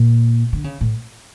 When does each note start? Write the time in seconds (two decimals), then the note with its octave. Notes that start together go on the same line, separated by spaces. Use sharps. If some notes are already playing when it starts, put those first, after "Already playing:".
Already playing: A#2
0.53 D3
0.64 C#3
0.81 A2